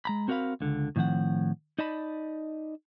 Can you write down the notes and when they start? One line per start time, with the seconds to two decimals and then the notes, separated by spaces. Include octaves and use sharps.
0.05 G#3 A#5 B5
0.28 C4 F#4 A#4 C#5 F5 B5
0.61 C#2 D3
0.96 A2 D#3 F3 C4 F#5
1.79 D#4 D5 D#5 A5 B5